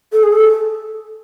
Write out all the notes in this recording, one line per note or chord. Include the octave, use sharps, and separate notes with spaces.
A4
G#4
A4